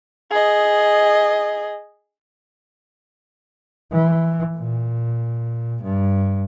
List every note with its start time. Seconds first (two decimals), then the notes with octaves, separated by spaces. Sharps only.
0.31 G#4 D#5
3.92 E3
4.56 A#2
5.82 G2